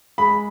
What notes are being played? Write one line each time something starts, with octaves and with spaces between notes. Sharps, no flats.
G#3 B5